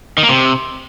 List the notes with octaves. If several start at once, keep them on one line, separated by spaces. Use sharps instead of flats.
D#3
A#3
C3